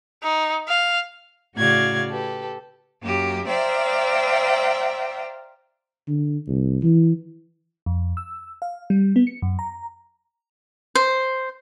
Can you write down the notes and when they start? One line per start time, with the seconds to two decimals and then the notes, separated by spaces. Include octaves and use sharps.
0.23 D#4
0.68 F5
1.57 A2 C#3 F#4 D5 F5 G#6
2.10 G4 A4 B4
3.02 F#2 A#3 G4
3.47 C5 D5 E5 F5 G5 A#5
6.08 D3
6.48 C2
6.83 E3
7.86 F2
8.17 E6
8.62 F5
8.90 G3
9.16 B3
9.27 C#7
9.42 F#2
9.59 A#5
10.95 C5